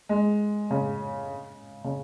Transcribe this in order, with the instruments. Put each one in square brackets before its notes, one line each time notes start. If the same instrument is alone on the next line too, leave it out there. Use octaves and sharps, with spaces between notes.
[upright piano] G#3
C#3
C#3